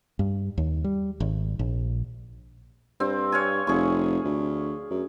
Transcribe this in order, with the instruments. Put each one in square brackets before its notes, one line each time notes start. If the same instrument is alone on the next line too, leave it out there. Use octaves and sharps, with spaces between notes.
[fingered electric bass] G2
D#2
G3
G#1
A#1
[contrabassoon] G2 [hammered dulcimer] C4
[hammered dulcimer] C#5 F5 G#5
[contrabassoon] F1 [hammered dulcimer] G#4 C#6
[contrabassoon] D2
F#2